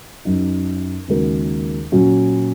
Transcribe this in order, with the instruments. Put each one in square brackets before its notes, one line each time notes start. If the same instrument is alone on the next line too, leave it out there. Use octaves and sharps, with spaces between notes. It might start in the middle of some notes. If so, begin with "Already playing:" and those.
[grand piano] F#2 F#3 D#4
D#2 C#3 G#3 F#4 A#4
A#2 F#3 C#4 F#4